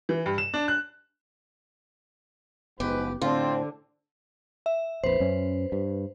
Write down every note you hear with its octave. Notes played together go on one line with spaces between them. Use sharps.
E3
G2
E7
D4
F#6
F#1 G#2 F3 B3 G4 B4
A2 D3 C4 F4
E5
A#1 F2 B4 C5
F#2 C#4
G2